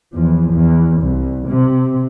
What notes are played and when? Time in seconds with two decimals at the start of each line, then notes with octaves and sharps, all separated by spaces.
0.13 E2 F3
0.53 E2
1.02 C2
1.48 C3